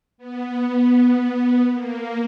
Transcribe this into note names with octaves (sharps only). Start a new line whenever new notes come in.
B3
A#3